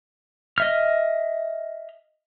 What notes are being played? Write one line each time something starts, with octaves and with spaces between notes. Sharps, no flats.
D#5 E5 F6